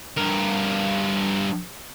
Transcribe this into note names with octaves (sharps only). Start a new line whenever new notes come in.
G2 A#4